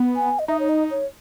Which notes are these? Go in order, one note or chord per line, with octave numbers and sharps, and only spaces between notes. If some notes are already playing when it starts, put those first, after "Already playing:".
Already playing: B3
G#5
D#5
D#4 E5
C#5
D#5
C#5